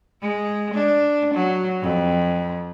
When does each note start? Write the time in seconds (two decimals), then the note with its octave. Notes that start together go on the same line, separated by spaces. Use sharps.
0.22 G#3
0.74 D4
1.34 F#3
1.82 F2